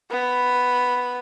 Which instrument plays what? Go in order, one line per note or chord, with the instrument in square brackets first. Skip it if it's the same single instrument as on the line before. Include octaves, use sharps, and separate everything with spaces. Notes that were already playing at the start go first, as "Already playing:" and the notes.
[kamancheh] B3 B5